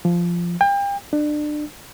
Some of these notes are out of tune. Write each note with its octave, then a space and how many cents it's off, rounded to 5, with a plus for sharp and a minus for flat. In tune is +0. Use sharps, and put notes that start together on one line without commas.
F3 -10
G5 +35
D4 +30